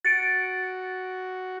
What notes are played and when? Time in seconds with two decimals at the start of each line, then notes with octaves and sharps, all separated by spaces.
0.05 F#4 A6 C#7 D7